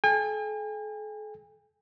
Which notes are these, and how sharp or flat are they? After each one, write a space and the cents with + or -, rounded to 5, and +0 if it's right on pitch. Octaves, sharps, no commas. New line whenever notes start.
A4 -45 G#5 -45